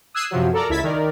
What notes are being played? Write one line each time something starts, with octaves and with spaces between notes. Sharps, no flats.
D#6 E6 F#6 G#6 C7 D#7
F#2 C3 F3 F#3
A4 A#4 D5 A#5
C#2 E4 A5 G#6 B6
D#3 A#4 D5